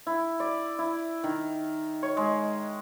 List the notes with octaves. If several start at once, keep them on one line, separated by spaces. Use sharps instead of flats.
E4
D5
E4
D#3
C#5
G#3